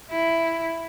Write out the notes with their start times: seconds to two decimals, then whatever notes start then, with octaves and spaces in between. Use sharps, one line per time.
0.11 E4